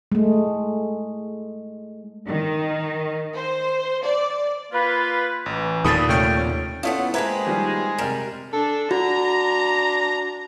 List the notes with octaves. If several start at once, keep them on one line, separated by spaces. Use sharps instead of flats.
G#3 A3
D#3
C5
D5
A#3 F4 B4
A1 E3
D#2 A#2 D#3 A4 B5 D#6 A6
C3 A3 C#5 G5 F6
A3 B3 C#4 E4 F4 A4 C#5 F#5
G#3 A#3 G4 B4 C5 E5 A#5 G#6
D#3 F3 G3
C3 G3 A#4
D4 A4
D4 F#4 A#5 A#6